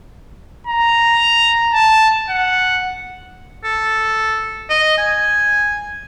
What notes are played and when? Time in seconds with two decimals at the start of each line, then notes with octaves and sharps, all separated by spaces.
0.67 A#5
1.74 A5
2.30 F#5
3.64 A4
4.69 D#5
4.98 G#5